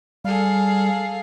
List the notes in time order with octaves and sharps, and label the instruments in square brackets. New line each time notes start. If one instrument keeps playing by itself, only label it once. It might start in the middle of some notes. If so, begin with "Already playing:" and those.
[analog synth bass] G3 [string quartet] G#4 A4 [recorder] F5